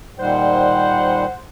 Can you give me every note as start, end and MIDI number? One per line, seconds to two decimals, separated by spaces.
0.19 1.25 46
0.19 1.25 51
0.19 1.25 55
0.19 1.43 72
0.19 1.43 78